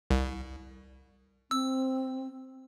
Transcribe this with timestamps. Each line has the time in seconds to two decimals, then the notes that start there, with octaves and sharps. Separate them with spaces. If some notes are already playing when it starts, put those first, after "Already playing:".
0.11 C2
1.51 C4 E6